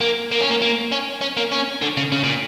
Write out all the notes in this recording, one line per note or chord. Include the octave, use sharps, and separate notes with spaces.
A#3
A#3
C#4
A#3
A#3
C#4
C#4
A#3
C#4
D3
C#3
C#3
A#2